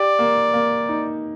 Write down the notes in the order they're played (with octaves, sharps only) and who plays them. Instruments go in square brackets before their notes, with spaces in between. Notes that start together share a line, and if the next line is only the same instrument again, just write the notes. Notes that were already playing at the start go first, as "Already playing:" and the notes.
Already playing: [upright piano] G4 [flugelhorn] D5
[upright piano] A#3
A#3
D#4